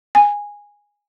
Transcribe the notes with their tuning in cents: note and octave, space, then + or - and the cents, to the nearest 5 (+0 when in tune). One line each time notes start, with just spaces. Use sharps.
G#5 -15